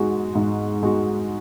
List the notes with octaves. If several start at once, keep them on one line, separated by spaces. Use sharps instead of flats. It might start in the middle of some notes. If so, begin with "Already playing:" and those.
Already playing: G#2 G#3 F#4
G#2
G#3 F#4